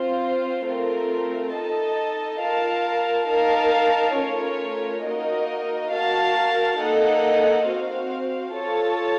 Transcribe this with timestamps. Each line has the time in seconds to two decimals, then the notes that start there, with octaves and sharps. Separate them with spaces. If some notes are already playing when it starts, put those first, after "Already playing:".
Already playing: C4 F4 C5
0.66 A3 C4 F4 A#4
1.53 D#4 A4 D#5 A5
2.41 F4 A#4 F5 A5
3.29 D#4 A#4 F5 A5
4.16 A3 C#4 F4 A#4 C#5
5.05 A#3 D#4 F#4 A#4 D#5
5.92 F#4 A#4 F5 A5
6.79 A#3 D#4 A4 D#5 F#5
7.67 C4 F#4 C5 F5
8.55 F4 A4 C#5 A5